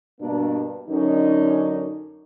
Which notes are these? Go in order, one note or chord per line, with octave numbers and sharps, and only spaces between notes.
G2 B2 A#3 D4
F#2 D3 C#4 D#4